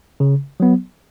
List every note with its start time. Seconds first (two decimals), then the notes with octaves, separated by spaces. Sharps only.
0.20 C#3
0.60 F#3 B3